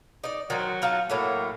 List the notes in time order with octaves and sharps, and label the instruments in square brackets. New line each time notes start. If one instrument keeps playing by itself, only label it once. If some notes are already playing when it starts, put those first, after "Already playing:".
[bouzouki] D#4 D5
[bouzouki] D#3 C5 [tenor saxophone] F#3
[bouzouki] D#4 F4 A5
[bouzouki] A2 F#3 A3 [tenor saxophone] A#3